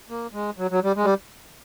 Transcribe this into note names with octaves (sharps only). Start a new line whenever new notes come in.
A#3
G#3
F#3
F#3
G3
G#3
G3